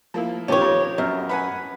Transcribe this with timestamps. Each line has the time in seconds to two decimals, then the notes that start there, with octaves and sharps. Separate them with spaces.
0.14 F3 A#3 E4
0.48 D#3 F3 C#4 G4 C#5
0.61 F2
0.98 F#2
1.29 B4 F#5 G#5